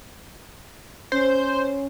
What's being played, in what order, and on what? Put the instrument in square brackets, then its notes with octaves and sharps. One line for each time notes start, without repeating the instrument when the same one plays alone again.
[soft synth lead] C#4 [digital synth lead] C5